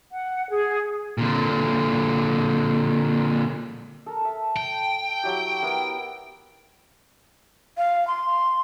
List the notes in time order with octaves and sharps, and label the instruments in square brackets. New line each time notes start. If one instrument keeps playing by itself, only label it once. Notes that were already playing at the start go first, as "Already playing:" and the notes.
[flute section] F#5
G#4
[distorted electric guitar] A#2 D3
[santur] A4 A#4
E5 A5
[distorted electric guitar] G5
[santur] F#3 E4 G4
B3 E4 A#4
[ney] F5
C6